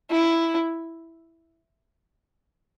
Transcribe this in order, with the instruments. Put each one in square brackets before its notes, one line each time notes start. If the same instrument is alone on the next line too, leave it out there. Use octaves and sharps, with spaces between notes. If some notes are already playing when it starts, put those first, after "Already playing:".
[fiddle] E4